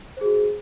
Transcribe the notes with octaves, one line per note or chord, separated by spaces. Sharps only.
F#4 G#4 C5